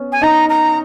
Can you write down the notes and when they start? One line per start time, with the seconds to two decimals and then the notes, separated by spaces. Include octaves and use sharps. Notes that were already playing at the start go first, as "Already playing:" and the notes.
Already playing: B3 C#4
0.12 G#5
0.22 D#4 A#5
0.49 A#5